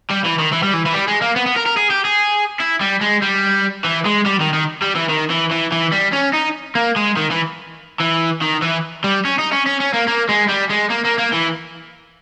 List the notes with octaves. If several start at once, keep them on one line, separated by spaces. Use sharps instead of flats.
G3
E3
D#3
E3
G3
E3
E3
G3
G#3
A#3
B3
B3
A#4
A#4
G#4
G4
G#4
E4
G3
G#3
G3
E3
G#3
G3
D#3
D#3
G3
E3
D#3
E3
E3
E3
G3
C#4
D#4
A#3
G#3
D#3
E3
E3
D#3
E3
G3
C#4
D#4
C#4
C#4
C#4
A#3
A#3
G#3
G3
G#3
A#3
A#3
A#3
E3